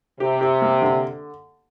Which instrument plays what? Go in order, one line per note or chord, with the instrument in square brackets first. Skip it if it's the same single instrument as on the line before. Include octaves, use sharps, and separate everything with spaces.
[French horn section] C3 [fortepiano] G4
[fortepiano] G4
A#3
D3